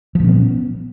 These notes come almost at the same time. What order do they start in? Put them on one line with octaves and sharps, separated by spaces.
F3 A#2 C#4 B3